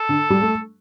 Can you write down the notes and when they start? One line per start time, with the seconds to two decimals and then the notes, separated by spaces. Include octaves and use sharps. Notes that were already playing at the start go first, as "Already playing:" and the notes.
Already playing: A4
0.09 D3
0.30 G3
0.42 A3